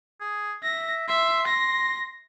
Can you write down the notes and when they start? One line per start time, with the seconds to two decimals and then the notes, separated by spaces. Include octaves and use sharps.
0.20 G#4
0.63 E5 A#6
1.08 E5 C6
1.47 A#6